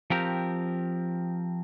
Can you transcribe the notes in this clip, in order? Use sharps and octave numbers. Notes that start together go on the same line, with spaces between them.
F3 C4 G4 A#4